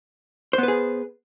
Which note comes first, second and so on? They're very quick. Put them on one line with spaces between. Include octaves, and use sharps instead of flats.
C5 B3 B4 G#4